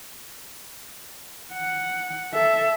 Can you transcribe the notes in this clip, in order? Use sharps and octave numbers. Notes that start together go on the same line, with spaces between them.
F#5
A4 E5